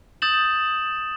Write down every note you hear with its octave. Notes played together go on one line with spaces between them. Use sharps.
D#6 G6 A6 E7 F#7